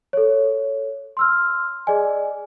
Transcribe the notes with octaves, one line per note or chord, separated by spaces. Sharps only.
A4 C#5
C6 E6 F6
G#4 D5 D#5 G#5